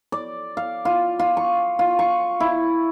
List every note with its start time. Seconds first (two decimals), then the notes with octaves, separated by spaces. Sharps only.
0.12 D5
0.57 F5
0.85 F4
1.19 F4
1.37 C#6
1.79 F4
1.99 C#6
2.40 E4